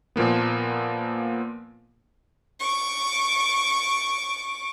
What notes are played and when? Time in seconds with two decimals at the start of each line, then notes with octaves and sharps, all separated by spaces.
0.16 A#2 F3 A#3 B3
2.60 C#6 D6